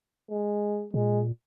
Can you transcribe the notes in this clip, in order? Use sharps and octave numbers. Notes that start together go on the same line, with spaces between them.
G#3
A#2 G#3